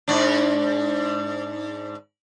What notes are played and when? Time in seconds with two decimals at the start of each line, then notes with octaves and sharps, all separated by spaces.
0.08 G#2 D4